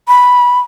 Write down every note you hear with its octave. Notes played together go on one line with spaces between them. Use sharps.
B5